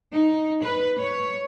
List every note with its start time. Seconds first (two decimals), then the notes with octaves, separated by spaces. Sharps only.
0.13 D#4
0.63 B4
0.99 C#5